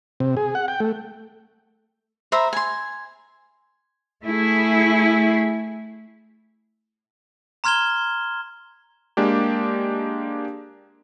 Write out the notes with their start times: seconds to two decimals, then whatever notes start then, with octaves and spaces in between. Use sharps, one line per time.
0.20 C3
0.37 G#4
0.55 F#5
0.68 G5
0.80 A3
2.32 C5 E5 A#5 B5
2.53 G#5 C6
4.23 A3 E4 G#4
7.64 A#5 C6 F6 G#6 E7 G7
9.17 G#3 A#3 D4 G4